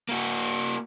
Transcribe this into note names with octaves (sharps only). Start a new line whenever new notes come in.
A#3 F#4